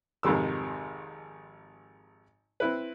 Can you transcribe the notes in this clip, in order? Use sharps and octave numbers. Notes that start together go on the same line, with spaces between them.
G#1 F2 C3 D#3 E6
C4 E4 B4